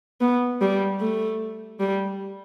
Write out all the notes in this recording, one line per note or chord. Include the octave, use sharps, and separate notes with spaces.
B3
G3
A3
G3